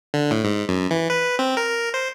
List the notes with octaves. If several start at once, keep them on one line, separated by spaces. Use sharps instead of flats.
D3
A2
G#2
F#2
E3
B4
C4
A#4
C5